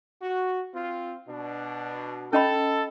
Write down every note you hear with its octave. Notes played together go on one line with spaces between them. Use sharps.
F#4
C4 F4
B2 D4
C#4 A4 D#5 B5